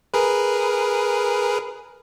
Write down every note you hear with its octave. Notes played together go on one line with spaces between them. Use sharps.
G#4 A#4 B4